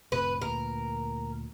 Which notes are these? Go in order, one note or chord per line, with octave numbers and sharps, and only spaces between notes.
F1 A2 C3 B4
D2 A#2 A#4